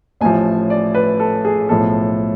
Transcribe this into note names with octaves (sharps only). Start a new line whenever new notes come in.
A1 A2 F3 G#5
D5
B4
A4
G#4
B1 A2 F3 A4